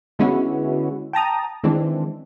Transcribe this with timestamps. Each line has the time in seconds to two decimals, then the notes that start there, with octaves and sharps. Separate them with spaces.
0.19 D3 G#3 B3 C#4 E4 F#4
1.13 G5 A5 A#5 D#6
1.64 D#3 E3 G#3 C4 D4